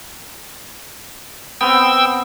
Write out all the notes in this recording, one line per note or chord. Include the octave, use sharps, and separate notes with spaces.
B3 C4 G5 E6